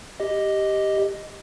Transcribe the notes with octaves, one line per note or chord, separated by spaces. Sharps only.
G4 D#5